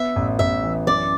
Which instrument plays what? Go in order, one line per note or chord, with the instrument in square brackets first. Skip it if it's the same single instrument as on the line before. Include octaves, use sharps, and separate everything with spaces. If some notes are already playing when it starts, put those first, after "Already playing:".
Already playing: [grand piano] B3 [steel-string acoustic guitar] E5
[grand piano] A1
[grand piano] A1 [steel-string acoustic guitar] E5
[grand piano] E3
[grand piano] F#2 [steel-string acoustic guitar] D5